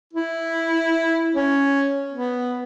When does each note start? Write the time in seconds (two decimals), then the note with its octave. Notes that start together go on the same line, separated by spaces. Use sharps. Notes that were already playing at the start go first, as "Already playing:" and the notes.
0.13 E4
1.35 C#4
2.13 B3